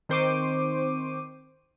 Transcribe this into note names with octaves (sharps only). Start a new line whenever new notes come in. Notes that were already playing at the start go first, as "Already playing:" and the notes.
D#3 C4 C5 C#6 D6 D#7